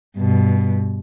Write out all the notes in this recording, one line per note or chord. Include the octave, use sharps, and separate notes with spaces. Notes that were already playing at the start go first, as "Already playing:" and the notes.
G2 B2